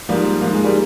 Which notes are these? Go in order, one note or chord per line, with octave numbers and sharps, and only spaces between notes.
G#2 F3 G3 A#3
G#2 F3 A#3
G#3
G3 A#3